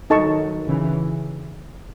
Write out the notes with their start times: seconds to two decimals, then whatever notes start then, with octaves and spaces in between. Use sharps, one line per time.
0.10 D#3 F#3 D#4 A4 D#5 A5 C#6
0.66 C#3 E3